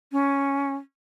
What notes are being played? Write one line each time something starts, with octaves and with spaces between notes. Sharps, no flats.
C#4